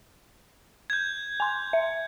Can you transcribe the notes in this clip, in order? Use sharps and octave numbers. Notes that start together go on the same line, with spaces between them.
G6 G#6
G#5 C6
E5